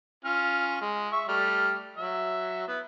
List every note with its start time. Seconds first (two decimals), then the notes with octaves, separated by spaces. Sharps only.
0.25 C#4 F4 F6
0.81 G#3
1.12 E5 C#6
1.29 G3 A3 F6
1.97 F#3 E5
2.68 B3 E4